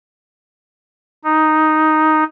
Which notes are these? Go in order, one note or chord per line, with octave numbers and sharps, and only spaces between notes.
D#4